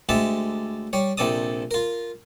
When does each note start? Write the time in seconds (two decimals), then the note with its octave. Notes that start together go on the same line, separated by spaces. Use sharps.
0.09 D2 G#3 G4 A4 E5 A5
0.93 G3 C#5
1.17 A#1 C3 A4 D5 A5 D#6
1.71 F4 A#4